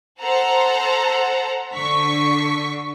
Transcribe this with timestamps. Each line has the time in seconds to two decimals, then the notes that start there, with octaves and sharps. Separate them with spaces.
0.22 A4 C5 F#5 A#5
1.74 D3 C#6 B6